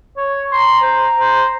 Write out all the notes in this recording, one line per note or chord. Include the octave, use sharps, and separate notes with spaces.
C#5
A#5 C6
C5
C5